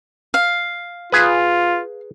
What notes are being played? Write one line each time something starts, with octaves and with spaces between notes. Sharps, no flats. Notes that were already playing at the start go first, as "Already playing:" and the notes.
F5
F4 G#4 B4